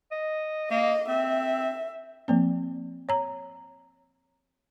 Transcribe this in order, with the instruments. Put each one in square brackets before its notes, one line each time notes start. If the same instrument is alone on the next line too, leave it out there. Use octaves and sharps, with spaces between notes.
[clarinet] D#5
[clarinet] A#3 [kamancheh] D#5
[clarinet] C4 [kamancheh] E5
[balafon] F3 A#3 C4
C#5 A#5